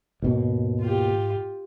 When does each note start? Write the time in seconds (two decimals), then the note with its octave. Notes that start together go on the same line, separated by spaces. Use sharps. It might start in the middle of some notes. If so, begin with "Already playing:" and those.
0.22 D#2 G#2 B2
0.81 F4 G4